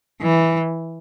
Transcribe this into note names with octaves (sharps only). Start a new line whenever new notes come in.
E3